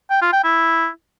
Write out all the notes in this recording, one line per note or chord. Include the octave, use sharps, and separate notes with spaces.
G5
F4
G5
E4